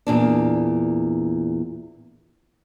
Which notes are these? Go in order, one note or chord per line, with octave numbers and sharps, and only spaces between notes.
E2 A#2 D4